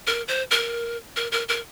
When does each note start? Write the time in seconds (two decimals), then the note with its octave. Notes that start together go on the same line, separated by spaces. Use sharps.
0.07 A#4
0.28 C5
0.51 A#4
1.16 A#4
1.32 A#4
1.49 A#4